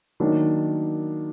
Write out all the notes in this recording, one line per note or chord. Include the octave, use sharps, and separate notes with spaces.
D#3 F#3 A#3 D4